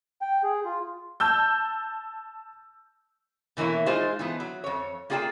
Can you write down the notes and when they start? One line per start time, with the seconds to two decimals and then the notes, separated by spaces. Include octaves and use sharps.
0.22 G5
0.44 G#4
0.65 F4
1.20 A5 E6 G6
3.57 B2 E3 A#3 E4 C#5
3.86 G#3 D#4 F4 G#4 C5
4.19 E3 F3 B3
4.40 F#3
4.64 F2 C#5
5.10 A#3 F4 G#4 D5 G5 A5